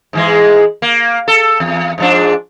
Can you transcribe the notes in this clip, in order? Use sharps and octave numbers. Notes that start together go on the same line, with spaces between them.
G#2 E3 G#3
A#3
A4
E2
G#2 F3 D4